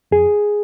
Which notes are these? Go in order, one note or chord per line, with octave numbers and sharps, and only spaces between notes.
F2 G#4